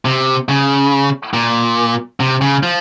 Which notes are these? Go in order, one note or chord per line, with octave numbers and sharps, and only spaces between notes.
C3
C#3
A#2
C3
C#3
F3